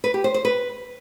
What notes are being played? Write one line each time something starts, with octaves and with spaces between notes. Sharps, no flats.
B4
G4
C5
C5
B4